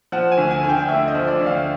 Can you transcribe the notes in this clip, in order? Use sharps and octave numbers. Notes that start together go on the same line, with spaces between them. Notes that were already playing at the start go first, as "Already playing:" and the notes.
F3 F#5
G#5
D2
G#5
D3
G5
D2 E5
D#5
F3
D5
D2
F5